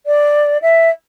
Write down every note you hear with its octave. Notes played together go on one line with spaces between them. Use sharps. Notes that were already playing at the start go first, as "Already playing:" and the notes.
D5
E5